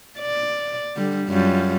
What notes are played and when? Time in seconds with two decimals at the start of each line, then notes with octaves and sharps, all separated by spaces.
0.19 D5
0.96 D3 G3
1.28 F#2 G3 F4